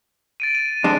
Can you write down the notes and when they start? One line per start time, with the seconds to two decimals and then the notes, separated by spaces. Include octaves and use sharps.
0.40 A6 D7 D#7
0.55 D#7
0.84 G#3 D4